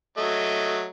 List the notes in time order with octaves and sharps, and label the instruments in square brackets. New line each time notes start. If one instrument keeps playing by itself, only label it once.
[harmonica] F#3 A3 D#5